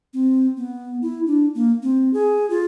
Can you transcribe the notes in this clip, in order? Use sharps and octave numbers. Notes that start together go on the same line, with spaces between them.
C4
B3
E4
D4
A#3
C4
G#4
F4